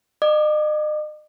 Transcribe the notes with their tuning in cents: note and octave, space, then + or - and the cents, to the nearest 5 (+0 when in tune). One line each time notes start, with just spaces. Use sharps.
D#5 -40 D6 +0